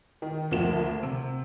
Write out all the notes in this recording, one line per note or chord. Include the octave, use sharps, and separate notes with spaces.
D#3
D2 F3 A#3 E7
C3